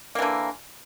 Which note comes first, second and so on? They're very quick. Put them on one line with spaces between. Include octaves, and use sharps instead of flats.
A#3 E3 D3